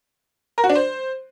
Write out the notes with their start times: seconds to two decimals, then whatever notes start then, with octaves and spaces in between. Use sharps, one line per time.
0.58 A#4
0.64 F#4
0.70 D4
0.75 C5